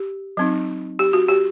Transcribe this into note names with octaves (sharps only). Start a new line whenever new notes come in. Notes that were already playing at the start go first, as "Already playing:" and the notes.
Already playing: G4
F#3 C4 D#4
G4
F#4
G4